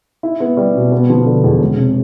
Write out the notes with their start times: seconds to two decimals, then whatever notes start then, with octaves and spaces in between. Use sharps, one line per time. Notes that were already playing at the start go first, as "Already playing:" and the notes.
0.23 E4
0.40 B3
0.57 G3
0.75 B2
0.92 B3
1.10 F3
1.26 D3
1.44 E2
1.61 E1
1.77 C3